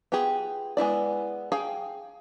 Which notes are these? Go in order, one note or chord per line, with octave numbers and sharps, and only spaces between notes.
B3 F4 G4 G#4
G#3 B3 E4 D5
G#4 F5 G5